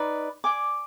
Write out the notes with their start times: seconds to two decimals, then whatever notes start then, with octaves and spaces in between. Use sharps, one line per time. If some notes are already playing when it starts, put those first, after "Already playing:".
Already playing: D#4 B4 D5
0.44 D5 G#5 D6